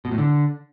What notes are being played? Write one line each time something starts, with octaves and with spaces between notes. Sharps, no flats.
B2
A2
D3